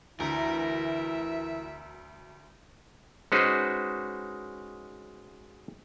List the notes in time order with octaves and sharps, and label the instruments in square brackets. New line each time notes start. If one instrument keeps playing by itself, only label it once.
[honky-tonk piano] D2 [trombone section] E3 E4 [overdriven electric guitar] A#4 [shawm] E5
[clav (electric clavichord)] G#3 C#4 D#4 F#4 B4 C5